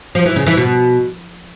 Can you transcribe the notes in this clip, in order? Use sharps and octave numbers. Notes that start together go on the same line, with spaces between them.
F3
E3
C#3
E3
B2